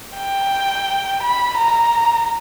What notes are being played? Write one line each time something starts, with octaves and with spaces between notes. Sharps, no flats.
G5
B5
A#5